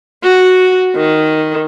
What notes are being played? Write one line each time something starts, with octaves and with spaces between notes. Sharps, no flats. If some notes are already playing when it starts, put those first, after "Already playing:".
F#4
D#3